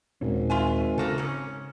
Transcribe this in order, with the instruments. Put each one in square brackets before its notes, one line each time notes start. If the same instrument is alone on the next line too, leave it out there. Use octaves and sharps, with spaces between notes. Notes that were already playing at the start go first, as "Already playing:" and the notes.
[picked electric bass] D#1 A#2 C#4 [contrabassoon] G#1
[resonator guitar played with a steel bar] F4 E5 G#5
[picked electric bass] C#3 [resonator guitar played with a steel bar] A3 A#3 A4
[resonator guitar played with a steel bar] G#2 C#4